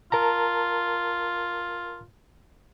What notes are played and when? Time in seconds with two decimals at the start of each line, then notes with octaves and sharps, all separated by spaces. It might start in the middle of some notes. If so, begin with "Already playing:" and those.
0.12 F4 A#4 A5 A#5